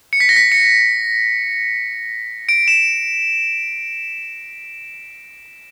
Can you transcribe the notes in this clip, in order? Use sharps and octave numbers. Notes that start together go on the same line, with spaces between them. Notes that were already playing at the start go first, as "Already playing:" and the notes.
C#7
B6
A#6
B6
C#7
D7
E7